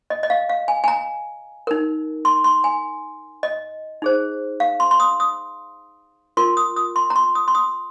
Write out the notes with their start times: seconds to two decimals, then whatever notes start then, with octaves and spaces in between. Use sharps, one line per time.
0.10 D#5
0.23 D#5
0.30 F5
0.49 F5
0.68 G#5
0.84 G#5
0.88 A#5
1.67 D#4 A#4
2.25 C6
2.44 C6
2.64 G#5
3.43 D#5
4.02 D#4 G#4 C5
4.60 F5
4.80 C6
4.91 C6
5.00 D#6
5.20 D#6
6.37 F4 A#4 C6
6.57 D#6
6.76 D#6
6.96 C6
7.10 A#5
7.16 C6
7.35 D#6
7.48 C6
7.55 D#6